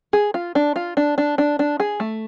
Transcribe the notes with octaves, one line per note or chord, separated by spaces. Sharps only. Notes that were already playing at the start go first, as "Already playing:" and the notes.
G#4
F4
D4
F4
D4
D4
D4
D4
G#4
A3